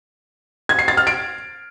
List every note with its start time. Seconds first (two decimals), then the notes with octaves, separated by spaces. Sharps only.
0.69 G#6
0.79 C7
0.88 A6
0.97 F6
1.07 D7